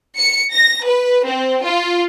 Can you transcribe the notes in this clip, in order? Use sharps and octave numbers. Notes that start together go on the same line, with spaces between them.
C#7
A#6
B4
C4
F4